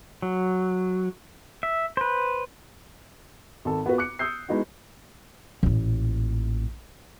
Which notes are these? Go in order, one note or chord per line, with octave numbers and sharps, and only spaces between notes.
F#3
E5
B4 C5
G#1 A4
B3 F4 F#4 B4
D6 F#6 C#7
D#6 E6 G6 C7
G#3 B3 D#4 E4 F#4
A1 A#2